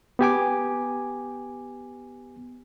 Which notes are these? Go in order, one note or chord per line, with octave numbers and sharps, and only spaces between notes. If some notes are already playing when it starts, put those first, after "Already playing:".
B3 G4 G#5 D6